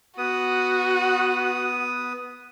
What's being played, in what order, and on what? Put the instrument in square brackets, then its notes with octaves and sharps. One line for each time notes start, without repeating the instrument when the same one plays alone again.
[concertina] B3 D#6 [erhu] F#4